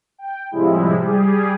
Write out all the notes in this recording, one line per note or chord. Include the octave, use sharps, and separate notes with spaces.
G5
A2 C3 F3 G3 G#3 E4
G3 G4 G#4